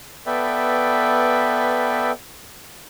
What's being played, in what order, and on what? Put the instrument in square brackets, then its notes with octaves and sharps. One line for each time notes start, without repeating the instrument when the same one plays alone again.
[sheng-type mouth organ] B3 A4 B4 D5 E5 G5